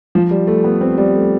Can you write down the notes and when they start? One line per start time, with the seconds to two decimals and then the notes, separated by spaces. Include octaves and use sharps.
0.15 F3
0.31 G3
0.47 A3
0.64 B3
0.81 C4
0.98 G3
1.14 A3